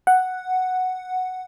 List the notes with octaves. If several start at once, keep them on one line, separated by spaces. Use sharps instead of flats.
F#5